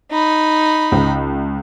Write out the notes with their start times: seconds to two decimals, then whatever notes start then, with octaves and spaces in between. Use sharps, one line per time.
0.11 D#4 B5
0.92 C#2